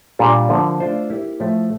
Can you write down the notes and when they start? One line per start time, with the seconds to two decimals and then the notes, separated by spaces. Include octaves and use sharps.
0.19 A#2 G3 D4 A4
0.49 D3 F3 A#3
0.80 A3 D4 F4 A4 C5
1.09 A#3 E4 G4
1.40 A2 F3 A3